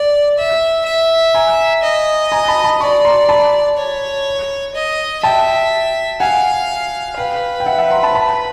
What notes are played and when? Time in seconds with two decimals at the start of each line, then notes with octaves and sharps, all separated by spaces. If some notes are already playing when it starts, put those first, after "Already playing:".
Already playing: D5
0.38 E5
0.85 E5
1.34 G#5 A#5
1.83 D#5
2.32 G#5 A#5
2.48 A5 B5
2.64 A5 B5
2.80 D5 B5 C#6
3.05 A#5 C6
3.29 A5 B5
3.77 C#5
4.75 D#5
5.23 E5 G5 A5
6.20 F5 F#5 G#5
7.17 B4 F5 G5
7.60 G5
7.66 E5 F#5
7.78 E5 F#5
7.90 A#5 C6
8.03 A5 B5
8.15 A5 B5